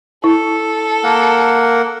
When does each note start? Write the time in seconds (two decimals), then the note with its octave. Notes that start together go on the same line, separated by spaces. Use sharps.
0.24 E4 A4
1.04 A#3 A#4 F#5